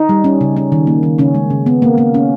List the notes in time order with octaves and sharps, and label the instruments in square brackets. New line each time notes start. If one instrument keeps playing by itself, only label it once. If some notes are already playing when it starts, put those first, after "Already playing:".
Already playing: [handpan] D#4
G3
C#4
C#3
C#4
D#3
A#3
D#3
C#3 C#4
G#3
C#3
B3
A#3
A#3
C#4